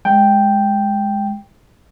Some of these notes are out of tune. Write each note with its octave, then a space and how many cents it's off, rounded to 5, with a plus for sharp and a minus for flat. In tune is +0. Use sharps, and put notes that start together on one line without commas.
G#3 +0 G5 +0